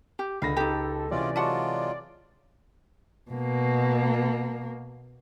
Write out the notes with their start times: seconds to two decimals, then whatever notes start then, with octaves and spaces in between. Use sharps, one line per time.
0.19 G4
0.42 C#2 D3 F5 B5 A#6
0.57 D#4 G4 A4
1.11 C3 E3 G#3 C#4 F4 D5
1.36 F#3 G#3 F4 F#4 F#5 A5
3.31 B2 A#3